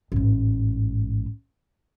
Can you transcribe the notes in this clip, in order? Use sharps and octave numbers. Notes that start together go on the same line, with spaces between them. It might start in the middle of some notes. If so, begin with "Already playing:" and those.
A1 G#2